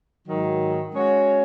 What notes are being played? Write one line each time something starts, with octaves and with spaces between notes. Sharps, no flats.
G#2 D#3 F#3
G#3 C#4 F#4 C#5